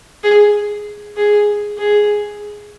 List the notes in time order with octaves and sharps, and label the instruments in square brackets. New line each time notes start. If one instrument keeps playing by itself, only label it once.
[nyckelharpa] G#4
G#4
G#4